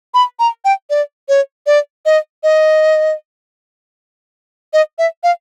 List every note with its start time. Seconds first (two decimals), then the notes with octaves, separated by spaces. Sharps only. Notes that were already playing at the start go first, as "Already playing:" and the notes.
0.14 B5
0.39 A#5
0.65 G5
0.90 D5
1.29 C#5
1.67 D5
2.06 D#5
2.43 D#5
4.73 D#5
4.98 E5
5.24 F5